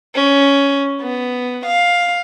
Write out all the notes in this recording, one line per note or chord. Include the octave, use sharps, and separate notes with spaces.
C#4
B3
F5